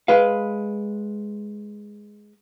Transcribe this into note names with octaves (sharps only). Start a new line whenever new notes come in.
G#3 B4 F5